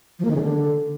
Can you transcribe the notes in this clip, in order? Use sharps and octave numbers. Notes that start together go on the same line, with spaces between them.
F3
A#3
D#3
C#3
D3